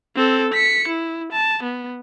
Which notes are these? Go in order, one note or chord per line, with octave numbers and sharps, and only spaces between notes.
C4 A4
B6 C#7
E4
A5
B3